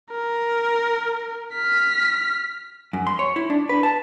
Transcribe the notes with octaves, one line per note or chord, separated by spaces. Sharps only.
A#4
F6 B6
F#2
C6
C#5
E4
D4
B4
A5